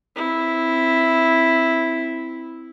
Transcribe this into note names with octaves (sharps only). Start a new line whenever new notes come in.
C4 E4